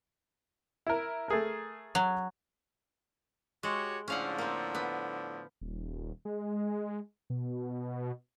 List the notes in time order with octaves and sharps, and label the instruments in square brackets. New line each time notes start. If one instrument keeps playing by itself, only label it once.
[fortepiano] E4 A#4
A3 G#4 A#4
[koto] F#3
[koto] G#3 [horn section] F#4 G4 C#5
[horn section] A2 D3 F3 [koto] C#4 F5 F#5
[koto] A#3 C4
B3
[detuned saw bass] D#1
G#3
B2